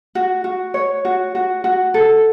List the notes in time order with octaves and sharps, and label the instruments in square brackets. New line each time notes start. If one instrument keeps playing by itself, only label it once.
[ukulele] F#4
F#4
C#5
F#4
F#4
F#4
A4